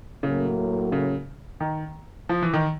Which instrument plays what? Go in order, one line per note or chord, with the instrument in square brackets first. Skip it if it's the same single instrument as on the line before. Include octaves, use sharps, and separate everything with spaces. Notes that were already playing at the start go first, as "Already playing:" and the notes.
[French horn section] A2 F#3 A#3 [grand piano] C#3
[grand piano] C#3
D#3
F3
E3
D#3